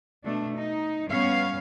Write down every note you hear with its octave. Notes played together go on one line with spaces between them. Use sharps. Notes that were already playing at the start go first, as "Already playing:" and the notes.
B2 A3 D4
D#4
G3 B3 C#4 C#5 F5